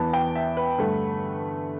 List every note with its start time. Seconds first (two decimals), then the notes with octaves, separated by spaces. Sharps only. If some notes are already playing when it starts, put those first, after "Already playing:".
Already playing: E2 E3 B3 A5
0.13 G5
0.35 E5
0.57 B4
0.78 G2 D3 A3